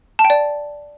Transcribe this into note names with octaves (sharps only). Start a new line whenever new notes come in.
A5
G5
D5